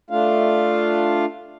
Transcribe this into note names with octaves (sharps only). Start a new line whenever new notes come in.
A3 D4 F4 F5